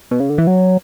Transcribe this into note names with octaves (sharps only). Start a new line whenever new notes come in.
B2
C#3
D3
E3
F#3